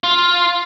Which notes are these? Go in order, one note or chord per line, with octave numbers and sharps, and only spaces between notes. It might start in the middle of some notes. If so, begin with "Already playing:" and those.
F4